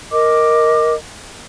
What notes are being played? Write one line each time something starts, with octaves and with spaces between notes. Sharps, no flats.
A#4 D#5 D6